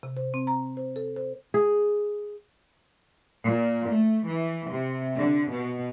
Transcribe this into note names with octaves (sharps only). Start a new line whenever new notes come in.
C3
C5
C4
A#5
C5
A4
C5
G#4
A#2
A3
E3
C3
D3
B2